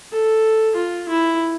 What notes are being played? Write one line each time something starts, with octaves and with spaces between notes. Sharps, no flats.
A4
F4
E4